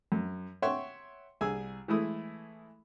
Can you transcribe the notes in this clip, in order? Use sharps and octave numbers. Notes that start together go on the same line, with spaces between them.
F#2
C#5 E5 F#5 G5 C6 C#6
C2 G#4 G#5 E6
E3 G#3 A3 E4 D#6